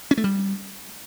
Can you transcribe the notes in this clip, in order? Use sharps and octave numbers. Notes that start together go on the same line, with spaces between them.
C#4
A3
G3